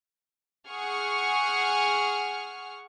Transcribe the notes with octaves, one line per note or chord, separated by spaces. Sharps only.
G#4 F#5 C#6 F6